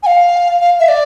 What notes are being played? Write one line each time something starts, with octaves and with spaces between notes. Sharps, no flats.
G#5
F5
F5
E5
D5